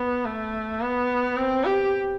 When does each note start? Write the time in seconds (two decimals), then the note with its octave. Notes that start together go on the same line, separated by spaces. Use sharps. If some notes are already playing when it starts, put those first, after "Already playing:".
Already playing: B3
0.25 A3
0.81 B3
1.36 C4
1.65 G4